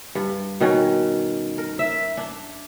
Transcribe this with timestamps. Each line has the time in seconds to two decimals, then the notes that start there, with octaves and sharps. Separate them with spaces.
0.15 G2
0.60 B2 D#3 C#4
1.58 A#4
1.79 E5
2.17 D4